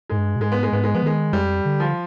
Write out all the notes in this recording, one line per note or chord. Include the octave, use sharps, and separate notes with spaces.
G#2 G#3
G2
B2
G#2 G#3
B3
G#3
G#2 B3
G#3
F3 B3
D#3 G#3
F2 G3
D3
F3